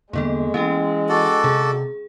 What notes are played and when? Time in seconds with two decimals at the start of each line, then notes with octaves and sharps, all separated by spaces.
0.13 E2 D3 G3 G#3 A#3 B3 A4
0.54 E3 C#4 G4 G5
1.09 F#4 A4 D5
1.44 C3 G#4